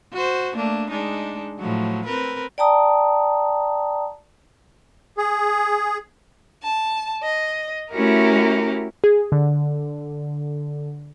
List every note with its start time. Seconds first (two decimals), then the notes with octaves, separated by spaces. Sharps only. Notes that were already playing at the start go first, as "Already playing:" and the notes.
0.13 F#4 C5
0.54 A3 A#3 D4
0.90 G#3 D4 D#4
1.59 A2 F3 F#3
2.05 C4 A#4 B4
2.58 D5 G5 A5 A#5 D#6
5.17 G#4
6.62 A5
7.23 D#5
7.91 A3 C#4 E4 F#4 G4 A#4
9.04 G#4
9.32 D3